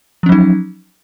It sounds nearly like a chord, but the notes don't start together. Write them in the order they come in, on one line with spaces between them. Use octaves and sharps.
F3 C#4 F#3 D#4